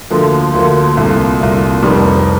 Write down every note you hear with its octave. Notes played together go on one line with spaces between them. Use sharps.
D2 D3 F3 A#3
D2 D3 F3 A#3
C2 A#2 A3
C2 A#2 A3
F1 F2 D#3 G3 C4